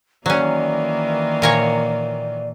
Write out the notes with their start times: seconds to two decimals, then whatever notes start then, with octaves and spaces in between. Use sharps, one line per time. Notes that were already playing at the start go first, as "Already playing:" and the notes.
0.26 D#3 E3 F#3 A#3 C#4 D5
1.42 A#2 A#4 C#5